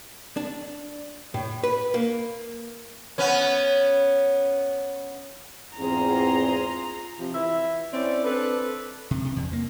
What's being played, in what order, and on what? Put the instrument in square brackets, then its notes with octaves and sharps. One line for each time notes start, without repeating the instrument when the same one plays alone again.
[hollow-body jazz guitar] D4
A2
B4
A#3
[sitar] B3 C#4
[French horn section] E2 G#2 C4 [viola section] F4 G#4 C6 [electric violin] A#5
[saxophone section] C3 F3
E3 E4 E5
C4 C#4 E4 D5
C4 D4 A4 B4
[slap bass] C3
C3
E2
A#3